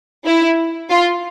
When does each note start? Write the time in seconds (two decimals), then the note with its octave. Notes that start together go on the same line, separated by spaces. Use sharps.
0.25 E4
0.90 F4